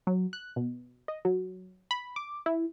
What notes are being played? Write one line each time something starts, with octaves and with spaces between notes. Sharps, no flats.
F#3
F#6
B2
D#5
F#3
B5
D6
E4